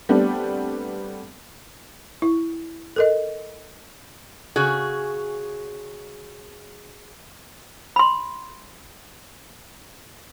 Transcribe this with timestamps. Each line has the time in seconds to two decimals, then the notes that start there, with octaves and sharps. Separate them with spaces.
0.09 G3 A3 B3 C4 D4
2.22 E4
2.96 A4 A#4 D#5
4.56 C#3 F#4 G#4
7.96 B5 C6